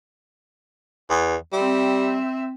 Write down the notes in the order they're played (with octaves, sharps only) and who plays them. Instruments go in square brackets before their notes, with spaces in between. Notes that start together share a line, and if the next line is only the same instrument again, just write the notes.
[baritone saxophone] E2
[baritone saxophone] G3 [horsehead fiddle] C4 E5